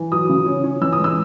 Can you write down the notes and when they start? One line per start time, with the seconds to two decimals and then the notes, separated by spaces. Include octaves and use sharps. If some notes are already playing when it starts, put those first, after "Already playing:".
Already playing: E3
0.12 F#3 D#6
0.29 C#3
0.46 C#4
0.64 C#4
0.81 E3 E6
0.93 D#6
0.99 G#3
1.04 E6